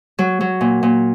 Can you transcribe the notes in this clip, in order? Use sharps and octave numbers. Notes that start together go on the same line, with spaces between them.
F#3
F#3
A#2
A#2